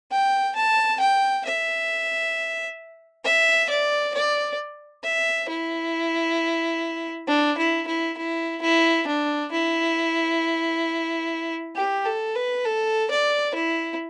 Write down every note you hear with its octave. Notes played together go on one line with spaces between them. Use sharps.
G5
A5
G5
E5
E5
D5
D5
E5
E4
D4
E4
E4
E4
E4
D4
E4
G4
A4
B4
A4
D5
E4